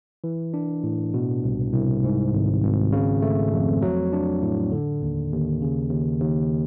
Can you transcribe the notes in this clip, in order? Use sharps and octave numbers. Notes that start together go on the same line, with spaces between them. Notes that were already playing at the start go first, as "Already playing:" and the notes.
E3
D4
A2
B2
C2
C2
G#2
G#1
G#1
C#3
A3
F2
F#3
D4
A2
D3
D#2
D#2
C#3
D#2
D#2